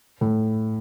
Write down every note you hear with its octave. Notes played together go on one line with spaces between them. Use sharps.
A2